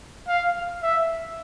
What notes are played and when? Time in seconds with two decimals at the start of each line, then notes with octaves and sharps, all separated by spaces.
0.28 F5
0.82 E5